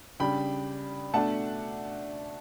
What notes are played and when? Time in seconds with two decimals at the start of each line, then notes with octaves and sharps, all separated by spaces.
0.20 C#3 G3 D4 G5 B5
1.14 B2 A3 D4 F#5 A5